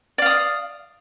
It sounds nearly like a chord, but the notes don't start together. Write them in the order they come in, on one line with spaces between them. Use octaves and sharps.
D5 F5 D#6